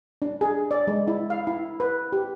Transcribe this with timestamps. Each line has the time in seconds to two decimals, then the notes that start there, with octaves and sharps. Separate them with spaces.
0.22 D4
0.41 G#4
0.71 D5
0.87 G#3
1.08 E4
1.30 F5
1.47 E4
1.80 B4
2.12 G4